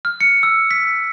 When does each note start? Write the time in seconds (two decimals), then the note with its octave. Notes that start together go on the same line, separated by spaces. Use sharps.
0.05 F6
0.21 C#7
0.43 E6
0.71 B6